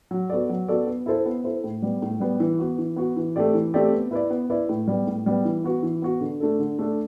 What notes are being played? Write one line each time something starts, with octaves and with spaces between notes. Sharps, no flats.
F#3
B3 F#4 A4 D5
F#3
B3 F#4 A4 D5
B3
E4 A4 C5
B3
E4 A4 C5
A2
G3 B3
A2
G3 B3
E3
B3 F#4
E3
B3 F#4
E3
A3 C4 G4 D5
E3
A3 C4 G4 D5
B3
E4 B4 D5
B3
E4 B4 D5
A2
G3 B3
A2
G3 B3
E3
B3 F#4
E3
B3 F#4
D3
A3 D4 A4
D3
A3 D4 A4